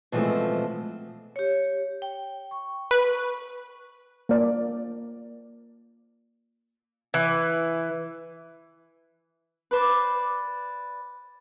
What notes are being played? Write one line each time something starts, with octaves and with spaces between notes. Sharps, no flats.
B2 E3 F3 G#3 A3 C4
G4 C#5
G5
C#6
B4
A#3 D5
E3
B4 C5 D5